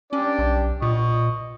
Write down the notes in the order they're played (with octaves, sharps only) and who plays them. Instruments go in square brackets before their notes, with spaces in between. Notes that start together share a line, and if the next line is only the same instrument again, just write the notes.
[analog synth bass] C#4 [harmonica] D4 G4 D5
[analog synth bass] B1
[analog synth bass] A#2 [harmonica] D#5 C#6